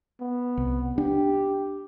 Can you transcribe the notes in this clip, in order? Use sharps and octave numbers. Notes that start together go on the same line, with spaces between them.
B3
C2
D4 G4